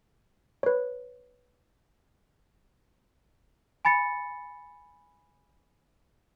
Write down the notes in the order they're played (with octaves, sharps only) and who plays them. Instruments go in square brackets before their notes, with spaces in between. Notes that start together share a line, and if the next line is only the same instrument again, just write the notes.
[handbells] B4 C#5
[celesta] G#5 B5 A6 C#7